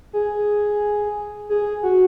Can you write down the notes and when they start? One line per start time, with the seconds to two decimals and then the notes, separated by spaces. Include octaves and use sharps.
0.13 G#4
1.49 G#4
1.83 F#4